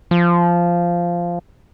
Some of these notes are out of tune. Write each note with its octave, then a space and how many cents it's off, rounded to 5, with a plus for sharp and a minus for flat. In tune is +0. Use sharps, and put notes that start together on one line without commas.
F3 -10